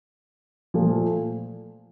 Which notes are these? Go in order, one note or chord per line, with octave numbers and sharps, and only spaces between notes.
A#2 F3 A3